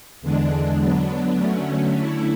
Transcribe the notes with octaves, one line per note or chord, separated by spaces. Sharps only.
E2 D3 G#3 D4
D3 F#3 B3 D4
D3 F#3 A3 C#4
D3 A3 E4